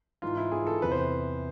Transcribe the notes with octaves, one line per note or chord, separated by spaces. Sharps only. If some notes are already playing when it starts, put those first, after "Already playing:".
G#2 E3 F4
E4
G#2 E3 G#4
A4
E2 C3 E3 B4
C5